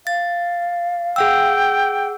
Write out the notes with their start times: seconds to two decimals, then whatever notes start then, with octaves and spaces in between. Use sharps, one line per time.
0.07 F5 A6
1.16 G#4 F#5 G5 E6